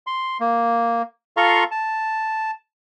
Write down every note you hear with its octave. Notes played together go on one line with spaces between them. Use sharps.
C6
A#3
F4 A4 F5 A#5 C6 C#6
A5